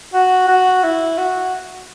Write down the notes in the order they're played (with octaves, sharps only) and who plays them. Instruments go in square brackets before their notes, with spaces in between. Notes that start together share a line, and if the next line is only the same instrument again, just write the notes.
[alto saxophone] F#4
F#4
E4
F#4